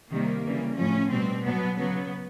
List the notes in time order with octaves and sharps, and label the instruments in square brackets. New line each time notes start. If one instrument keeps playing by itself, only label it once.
[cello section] C3 D#3 G3 A#3
C#3 E3 G3
A2 F3 C#4
B2 G3 C4
B2 F#3 B3
C#3 F#3 B3